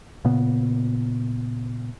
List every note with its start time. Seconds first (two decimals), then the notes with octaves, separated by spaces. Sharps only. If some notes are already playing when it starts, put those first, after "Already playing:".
0.25 A#2 C#3 B3